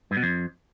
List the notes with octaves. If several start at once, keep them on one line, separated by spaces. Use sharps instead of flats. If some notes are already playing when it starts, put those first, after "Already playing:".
G2
B2
F2